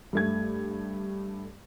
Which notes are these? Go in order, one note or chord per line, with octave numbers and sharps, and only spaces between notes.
G2 A3 G#6